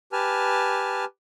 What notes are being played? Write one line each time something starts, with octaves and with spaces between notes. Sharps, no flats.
G4 B4 G#5 A5 F6